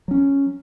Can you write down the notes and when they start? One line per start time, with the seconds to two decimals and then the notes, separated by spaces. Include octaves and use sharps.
0.08 F#3 C#4